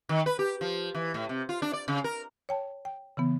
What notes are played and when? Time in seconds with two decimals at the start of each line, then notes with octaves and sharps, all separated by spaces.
0.09 D#3
0.26 B4
0.39 G4
0.61 F3
0.95 E3
1.14 A2
1.29 C3
1.49 F4
1.62 D4
1.73 D5
1.88 C#3
2.04 A#4
2.49 C#5 G5 A5
2.85 G5
3.17 C#3 E3 B3